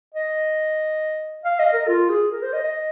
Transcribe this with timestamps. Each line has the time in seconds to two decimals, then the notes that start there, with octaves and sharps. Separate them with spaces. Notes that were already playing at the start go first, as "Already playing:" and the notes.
0.14 D#5
1.45 F5
1.59 D#5
1.73 A#4
1.88 F4
2.10 G#4
2.31 A#4
2.42 C5
2.53 D#5
2.64 D#5